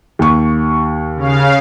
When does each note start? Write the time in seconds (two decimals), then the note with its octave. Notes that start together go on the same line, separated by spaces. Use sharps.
0.19 D#2 C#6
1.16 C#3 F5